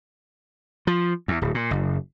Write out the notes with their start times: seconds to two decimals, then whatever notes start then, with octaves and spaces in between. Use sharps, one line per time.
0.87 F3
1.28 E2
1.41 D1
1.55 A#2
1.71 F#1